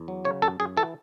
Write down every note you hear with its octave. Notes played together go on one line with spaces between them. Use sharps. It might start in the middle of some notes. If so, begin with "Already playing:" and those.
Already playing: E2
F#3
C#3 C#5
F#2 A4
F#2 G#4
E3 A4